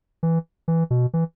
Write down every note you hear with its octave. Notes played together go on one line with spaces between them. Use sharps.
E3
E3
B2
E3